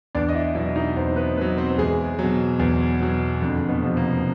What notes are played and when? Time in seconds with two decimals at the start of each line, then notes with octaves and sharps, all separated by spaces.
0.15 E2 D4 D5
0.29 D#5
0.34 E4 E5
0.55 B2 F#3 E4 E5
0.76 D#4 D#5
0.96 E2 C4 C5
1.16 B3 B4
1.37 B2 F#3 B3 B4
1.57 C4 C5
1.78 E2 G#3 G#4
2.19 B2 F#3
2.59 E2
3.01 B2 F#3
3.41 F2 D3 D4
3.68 B2 B3
3.82 C3 F3
3.97 A#3